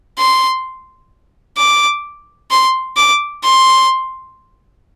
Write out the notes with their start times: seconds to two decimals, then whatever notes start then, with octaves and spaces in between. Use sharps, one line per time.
0.18 C6
1.57 D6
2.51 C6
2.97 D6
3.44 C6